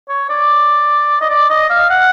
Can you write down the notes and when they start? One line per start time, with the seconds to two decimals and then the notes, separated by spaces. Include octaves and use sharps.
0.09 C#5
0.30 D5
1.21 D#5
1.30 D5
1.50 D#5
1.70 F5
1.90 F#5